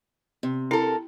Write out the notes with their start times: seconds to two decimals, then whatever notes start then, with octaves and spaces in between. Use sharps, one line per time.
0.43 C3
0.71 E4 A4 A#4